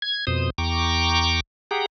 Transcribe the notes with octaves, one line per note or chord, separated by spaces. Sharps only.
G#6
F2 B2 C5 D#6
E2 G5 A#5 C#6 D6
G4 G#4 F#5 G5 A#5